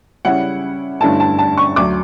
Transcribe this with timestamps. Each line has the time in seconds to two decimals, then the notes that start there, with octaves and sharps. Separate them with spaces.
0.25 C#3 G3 C#4 E4 F#5
1.01 G2 D3 A3 C#4 E4 A5
1.20 A5
1.39 A5
1.57 C#6
1.76 D2 D3 F#3 D6